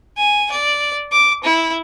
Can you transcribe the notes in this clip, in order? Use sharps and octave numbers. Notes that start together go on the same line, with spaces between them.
G#5
D5
D6
E4